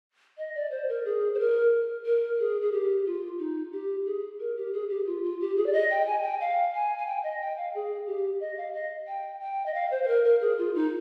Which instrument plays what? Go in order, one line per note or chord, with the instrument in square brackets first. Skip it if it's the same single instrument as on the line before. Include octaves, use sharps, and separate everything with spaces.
[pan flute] D#5
D5
C5
A#4
G#4
C5
A#4
A#4
G#4
G#4
G4
F4
D#4
G4
G#4
A#4
G4
G#4
G4
F4
F4
G4
G#4
D5
D#5
G5
G#5
G5
F5
G#5
G#5
G5
D#5
G5
F5
G#4
G4
D#5
F5
D#5
G5
G5
D#5
F5
C5
C5
A#4
A#4
G#4
F4
D#4